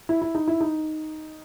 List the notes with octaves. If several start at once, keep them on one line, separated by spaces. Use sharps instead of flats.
E4
E4
D#4
E4
D#4